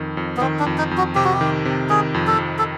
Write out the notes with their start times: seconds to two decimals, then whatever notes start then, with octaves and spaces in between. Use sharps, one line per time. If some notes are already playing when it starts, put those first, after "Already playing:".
Already playing: F2 D#3
0.17 F2
0.37 B3
0.41 D#3 C4
0.59 D4
0.66 F2
0.78 D#4
0.91 F2
0.98 F#4
1.15 C3 G4
1.24 F#4
1.33 G4
1.41 D#3
1.65 C3
1.89 D#3 G#4
2.14 F2
2.27 A4
2.38 F2
2.59 A4